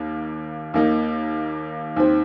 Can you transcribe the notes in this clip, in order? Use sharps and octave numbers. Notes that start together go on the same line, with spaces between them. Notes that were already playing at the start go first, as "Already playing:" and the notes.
Already playing: D#2 D#3 A#3
D#2 D#3 A#3 D#4
D#2 D#3 C4